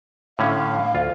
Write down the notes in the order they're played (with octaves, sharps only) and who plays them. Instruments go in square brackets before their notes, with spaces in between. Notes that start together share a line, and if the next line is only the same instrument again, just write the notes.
[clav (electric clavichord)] A2 D3 C#4 [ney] F5
[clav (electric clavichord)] D2 F4